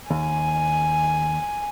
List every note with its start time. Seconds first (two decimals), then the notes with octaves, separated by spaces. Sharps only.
0.10 D#2 G#5